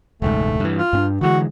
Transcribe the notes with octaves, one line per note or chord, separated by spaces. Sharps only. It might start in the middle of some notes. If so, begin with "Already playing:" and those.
E1 C#2 G#2 A3
G2 E3
F4
G2 C4 D4
D3 E3 G#3 F#4